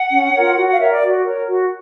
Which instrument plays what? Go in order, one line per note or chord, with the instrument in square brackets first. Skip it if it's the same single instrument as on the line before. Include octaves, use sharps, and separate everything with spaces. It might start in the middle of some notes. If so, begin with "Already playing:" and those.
Already playing: [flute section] F#5
C#4
F4 A#4 C#5
F#4
F#5
F5
A#4 C#5 E5
D5
F#4
A#4 C#5
F#4